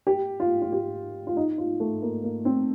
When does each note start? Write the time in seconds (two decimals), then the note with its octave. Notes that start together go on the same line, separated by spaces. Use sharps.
0.07 G4
0.40 F4
0.62 F4
0.72 G4
1.27 F4
1.37 D#4
1.58 F4
1.80 A3
2.02 A#3
2.23 A#3
2.45 C4